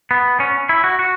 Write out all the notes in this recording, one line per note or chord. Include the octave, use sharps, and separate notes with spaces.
B3
C#4
E4
F#4
F#4